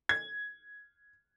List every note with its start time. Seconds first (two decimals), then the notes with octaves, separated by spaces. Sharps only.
0.09 G#6